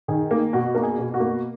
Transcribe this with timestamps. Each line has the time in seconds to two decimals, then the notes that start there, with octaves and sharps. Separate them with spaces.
0.08 D#3 G#4
0.31 A#3
0.53 B2 F#4
0.75 A#3 A#4
0.83 G#4
0.99 B2
1.14 F#4
1.20 A#3